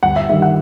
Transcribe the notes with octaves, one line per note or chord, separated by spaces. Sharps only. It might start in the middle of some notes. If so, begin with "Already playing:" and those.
G1 F#5
E5
G2 D#3 E5
F#5